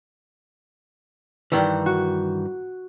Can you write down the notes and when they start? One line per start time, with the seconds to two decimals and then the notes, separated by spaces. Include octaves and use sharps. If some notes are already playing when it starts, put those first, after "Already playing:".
1.52 G2 D#3 E3
1.86 F#4